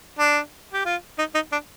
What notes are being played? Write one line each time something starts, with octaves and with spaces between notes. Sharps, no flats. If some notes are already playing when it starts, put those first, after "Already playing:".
D4
G4
F4
D#4
D#4
D4